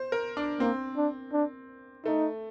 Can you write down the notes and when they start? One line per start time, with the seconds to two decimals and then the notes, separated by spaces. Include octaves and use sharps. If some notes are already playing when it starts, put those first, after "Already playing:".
Already playing: C5
0.12 A#4
0.37 D4
0.60 A#3 C4
0.97 D4
1.33 D4
2.05 A3 D#4